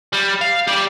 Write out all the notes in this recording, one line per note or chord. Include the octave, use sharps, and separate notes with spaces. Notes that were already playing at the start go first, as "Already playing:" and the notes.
G3
F5
G4 D5